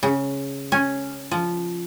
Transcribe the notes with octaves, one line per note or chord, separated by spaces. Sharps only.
C#3
C#4
F3